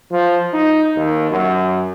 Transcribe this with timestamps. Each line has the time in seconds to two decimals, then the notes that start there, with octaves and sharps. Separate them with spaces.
0.11 F3
0.53 D#4
0.96 D#2
1.31 F#2